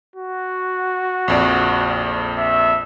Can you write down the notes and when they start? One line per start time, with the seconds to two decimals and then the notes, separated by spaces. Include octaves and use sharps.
0.16 F#4
1.28 A#1 F2 D5
2.38 E5